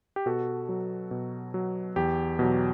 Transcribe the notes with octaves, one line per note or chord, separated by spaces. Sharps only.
G4
B2 F#4 A4
F#3
B2
F#3
E2 G4
B2 F#3